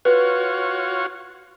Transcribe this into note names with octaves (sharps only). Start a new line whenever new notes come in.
F4 F#4 B4 C#5